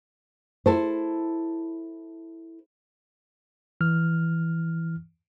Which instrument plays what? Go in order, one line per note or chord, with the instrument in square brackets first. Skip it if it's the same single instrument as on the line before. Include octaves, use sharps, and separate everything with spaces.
[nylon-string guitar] E4 A4 C5
[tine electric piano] E3 F6